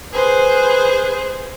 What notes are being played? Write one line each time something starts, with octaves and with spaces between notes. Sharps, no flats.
G#4 B4 C5